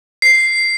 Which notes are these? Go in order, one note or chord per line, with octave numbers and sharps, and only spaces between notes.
C7